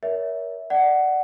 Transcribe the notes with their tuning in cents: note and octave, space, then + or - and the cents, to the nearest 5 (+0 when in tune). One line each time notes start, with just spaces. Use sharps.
A#4 +25 C#5 +25 E5 -10
D5 +15 F#5 +15